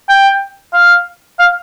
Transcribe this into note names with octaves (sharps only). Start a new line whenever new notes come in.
G5
F5
F5